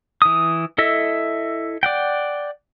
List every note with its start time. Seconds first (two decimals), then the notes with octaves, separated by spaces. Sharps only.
0.22 E3 D#6
0.78 E4 A4 D#5 E5
1.83 D5 F#5 G5